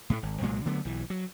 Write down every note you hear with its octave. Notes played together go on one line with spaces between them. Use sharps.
A2 F#3 A3
G#1
C2 A#2 F#3 G#3
D3 F#3 A3 B3
B1 E3
F#3